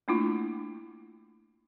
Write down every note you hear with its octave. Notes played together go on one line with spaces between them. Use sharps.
A3 A#3 D4 E4 F4